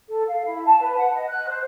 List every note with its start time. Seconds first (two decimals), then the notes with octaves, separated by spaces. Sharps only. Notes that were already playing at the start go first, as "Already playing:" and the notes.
0.08 A4
0.27 F5
0.45 E4
0.64 A5
0.80 B4
0.97 F#5
1.13 D#5
1.27 F#6
1.47 C5